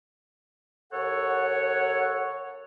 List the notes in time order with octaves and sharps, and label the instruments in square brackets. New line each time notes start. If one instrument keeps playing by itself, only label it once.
[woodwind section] D#2 A4 C#5 F#5